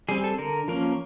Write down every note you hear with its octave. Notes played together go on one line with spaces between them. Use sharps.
G3 C4 G#4
A4
D3 A#4
F3 A#3 C#4 A#4